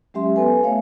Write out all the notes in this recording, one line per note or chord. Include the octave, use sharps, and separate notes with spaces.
F#3 G#3 C#4 G4 E5 C6
B3 A4 B4 G#5
A3 C#5 E5 F5